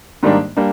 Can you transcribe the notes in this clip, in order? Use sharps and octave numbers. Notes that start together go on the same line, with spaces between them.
G#2 D#3 G3 A#3 D4
G3 A#3 D4